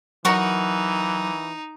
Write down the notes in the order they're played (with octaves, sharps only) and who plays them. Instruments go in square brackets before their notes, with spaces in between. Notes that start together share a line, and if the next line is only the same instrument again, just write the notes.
[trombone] E3 [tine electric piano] F#3 [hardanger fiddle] D#4 [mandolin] A#4 F#5 C#6